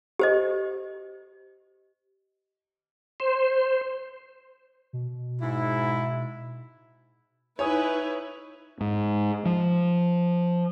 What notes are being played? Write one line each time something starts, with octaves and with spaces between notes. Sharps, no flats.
G4 C5 D#5
C5
B2
G#2 E4
D#4 E4 B4 C#5 G#5 D#6
G#2
F3